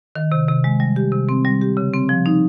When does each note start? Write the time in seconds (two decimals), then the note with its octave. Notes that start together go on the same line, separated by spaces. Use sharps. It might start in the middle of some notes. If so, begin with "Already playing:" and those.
0.16 D#3
0.32 C3
0.48 C3
0.64 G#3
0.80 G3
0.96 G4
1.12 C3
1.29 C4
1.45 G3
1.61 G4
1.77 C#3
1.94 C4
2.09 F3
2.26 D#4